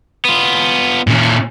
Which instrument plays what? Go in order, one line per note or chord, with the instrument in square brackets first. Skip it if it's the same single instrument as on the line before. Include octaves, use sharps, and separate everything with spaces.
[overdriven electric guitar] B3 F4
[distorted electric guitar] A#2 C#4